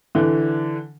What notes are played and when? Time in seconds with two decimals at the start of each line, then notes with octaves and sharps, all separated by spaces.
0.15 D3 E3